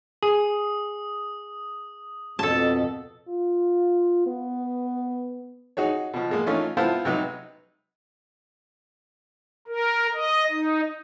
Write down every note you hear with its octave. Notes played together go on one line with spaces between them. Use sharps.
G#4 D#6
F2 B2 A4 A5
F4
B3
D#4 F#4 G#4 C#5
B2 F3
B2 G#3 A#3
E3 A3 C#4 D#4 F4
B3 E4 F4 C5 F5 A5
C3 F#3 D#4 B4
A#4
D#5
D#4